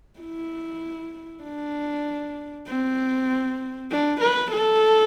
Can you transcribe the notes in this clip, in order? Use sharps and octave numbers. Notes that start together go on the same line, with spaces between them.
E4
D4
C4
D4
B4
A4